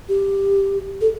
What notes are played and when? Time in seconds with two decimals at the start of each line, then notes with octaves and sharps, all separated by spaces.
0.09 G4
1.01 A4